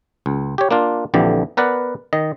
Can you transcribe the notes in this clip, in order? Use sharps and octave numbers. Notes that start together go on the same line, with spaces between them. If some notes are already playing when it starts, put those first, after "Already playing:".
C#2
G4 C#5
A#3 D4 F4
A#1 F2 D3 E3 G4
B3 A#4 B4 D5 F#5
D#3 D#5